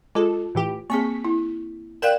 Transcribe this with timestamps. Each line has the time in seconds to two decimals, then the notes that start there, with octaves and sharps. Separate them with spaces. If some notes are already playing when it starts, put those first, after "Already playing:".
0.15 G#3 F4 A4
0.55 A2 E3 G4
0.90 A#3 C4 G#4 C#6 B6
1.25 E4
2.02 A#4 D5 F5 G5 F#6 E7